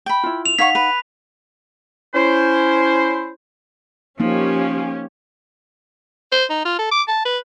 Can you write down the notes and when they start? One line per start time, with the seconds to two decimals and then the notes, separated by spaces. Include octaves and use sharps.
0.06 G5 B5
0.23 E4 F4
0.46 F7
0.59 D#4 C#5 F5 F#5 C#6 B6
0.75 B4
2.15 C#4 E4 C5
4.20 F3 A#3 C#4 D#4 G4
6.32 C5
6.50 D#4
6.65 F4
6.79 A4
6.92 D6
7.08 A5
7.25 B4